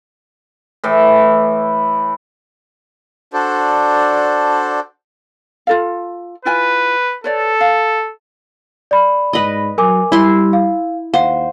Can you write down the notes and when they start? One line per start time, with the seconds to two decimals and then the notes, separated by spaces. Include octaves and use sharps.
0.84 A2 E3
3.33 D4 F#4 A4 C5 D5
5.67 F4 A4 F5
6.45 E4 F4 B4 G#5
7.24 A4 B4 C#5 D5
7.61 F5
8.91 D5 B5
9.33 G#2 B4 D#5
9.78 F#3 A#4 G#5 D6
10.12 G3 E4 C6
10.53 F5
11.14 D#2 C5 F5 F#5